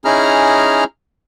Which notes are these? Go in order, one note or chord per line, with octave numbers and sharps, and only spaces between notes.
C#4 D#4 E4 G#4 A#5 F6